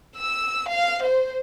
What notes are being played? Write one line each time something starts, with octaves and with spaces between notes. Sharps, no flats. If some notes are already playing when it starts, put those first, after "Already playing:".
E6
F5
C5